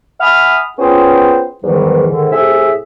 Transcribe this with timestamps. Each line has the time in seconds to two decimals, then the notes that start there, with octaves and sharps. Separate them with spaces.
0.20 E5 F#5 G#5 B5 D#6 F6
0.79 B3 C#4 F4 G#4 C5 G5
1.64 E2 G#2 D#3 E3 F#3 G3
2.08 G#2 D3 D#3
2.32 A2 C3 G#4 E5 G#5